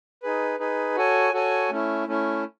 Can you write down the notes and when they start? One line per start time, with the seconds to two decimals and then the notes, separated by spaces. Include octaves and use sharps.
0.23 D#4 G#4 B4
0.59 D#4 G#4 B4
0.96 F#4 A4 C#5 G#5
1.33 F#4 A4 C#5 G#5
1.70 A3 C#4 E4
2.08 A3 C#4 E4